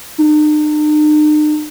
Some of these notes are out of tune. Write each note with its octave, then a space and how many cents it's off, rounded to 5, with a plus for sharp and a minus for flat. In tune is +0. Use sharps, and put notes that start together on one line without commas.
D#4 -45